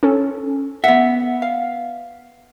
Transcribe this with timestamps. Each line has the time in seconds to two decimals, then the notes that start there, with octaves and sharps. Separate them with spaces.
0.03 C#4 A4
0.84 B3 E5 F#5
1.42 F5